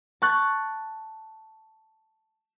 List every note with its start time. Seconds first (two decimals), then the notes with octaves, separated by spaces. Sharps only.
0.22 A5 C#6 F#6 G6 A6